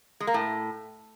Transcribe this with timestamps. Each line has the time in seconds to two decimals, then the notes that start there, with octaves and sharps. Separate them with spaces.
0.20 G#3
0.27 A#3
0.34 A2